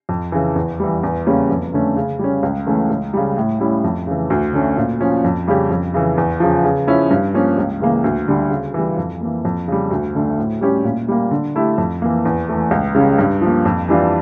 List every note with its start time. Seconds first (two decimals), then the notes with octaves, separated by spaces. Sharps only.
0.09 F2
0.32 C#3 E3
0.56 E2
0.80 E3 G3
1.03 E2
1.26 C#3 G3 A#3 C#4
1.50 F2
1.73 D3 A3 C#4
1.97 C#3
2.19 G3 C#4
2.43 C#2
2.66 C#3 E3 A3 C#4
2.90 C#2
3.13 C#3 G3
3.37 A2
3.60 G3 C#4 E4
3.84 F2
4.07 C#3 E3
4.30 D2
4.53 D3 A3 C#4
4.78 A#2
5.01 F3 C#4
5.24 F2
5.48 C#3 G3 C#4 G4
5.70 F2
5.94 C#3 E3
6.18 E2
6.40 C#3 F3
6.64 C#3
6.87 F3 C#4 E4
7.11 G2
7.34 F3 A#3 C#4
7.58 C#2
7.81 C#3 E3 A#3
8.04 D2
8.28 D3 G3
8.50 C#3
8.74 E3 G3
8.97 F2
9.21 E3 A#3
9.45 F2
9.68 C#3 G3
9.91 D2
10.15 D3 A3
10.38 A2
10.61 G3 C#4 G4
10.84 A#2
11.08 G3 A#3
11.31 D3
11.56 A3 E4 G4
11.78 F2
12.02 E3 A#3
12.25 E2
12.49 E3 A3
12.71 C#2
12.95 C#3 G3 C#4
13.19 G2
13.41 F3 A#3
13.65 F2
13.89 E3 G3 D4 F4